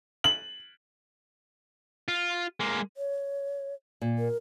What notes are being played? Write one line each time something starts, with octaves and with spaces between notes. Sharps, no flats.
F#7
F4
G#3 A#3
C#5
A#2
A#4